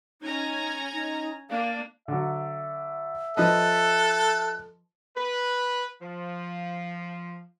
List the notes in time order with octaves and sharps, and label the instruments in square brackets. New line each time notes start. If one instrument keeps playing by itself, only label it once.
[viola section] C#4 G#5 A#5 [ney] D#4
[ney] D#4
[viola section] A#3 D4 [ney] F5
[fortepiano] D3 F#3 [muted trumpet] E5
[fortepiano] F3 B4 D#5 [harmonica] A4 [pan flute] F#6
[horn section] B4
F3